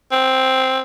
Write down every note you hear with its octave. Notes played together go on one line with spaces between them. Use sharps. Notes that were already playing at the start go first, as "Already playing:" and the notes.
C4